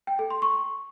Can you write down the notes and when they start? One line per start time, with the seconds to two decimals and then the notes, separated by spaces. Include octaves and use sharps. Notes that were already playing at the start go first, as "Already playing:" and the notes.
0.07 G5
0.19 A4
0.30 C6
0.42 C#6